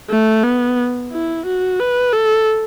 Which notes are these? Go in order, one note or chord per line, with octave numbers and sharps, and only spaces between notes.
A3
B3
E4
F#4
B4
A4